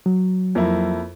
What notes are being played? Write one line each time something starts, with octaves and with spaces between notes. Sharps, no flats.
F#3
F2 A#3 E4